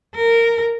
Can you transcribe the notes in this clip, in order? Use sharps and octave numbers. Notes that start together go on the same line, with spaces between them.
A#4